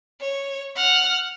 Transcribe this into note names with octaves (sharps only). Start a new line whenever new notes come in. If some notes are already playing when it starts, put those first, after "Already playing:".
C#5
F#5 F6